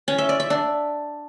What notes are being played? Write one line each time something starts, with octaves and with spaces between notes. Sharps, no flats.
C#4
E5
D5
E5
D4